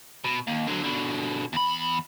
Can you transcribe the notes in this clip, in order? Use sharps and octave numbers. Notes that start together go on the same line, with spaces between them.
B2
D#2
D3 F#3
B2 D3
E2 B5